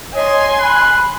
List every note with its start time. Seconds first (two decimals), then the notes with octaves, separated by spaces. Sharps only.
0.14 C#5 D#5 G#5 C6
0.60 B5 F#6